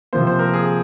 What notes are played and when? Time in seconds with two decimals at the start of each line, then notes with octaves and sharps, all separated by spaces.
0.13 C3 F3 A#3 C5
0.27 C5
0.39 A#4
0.53 G#4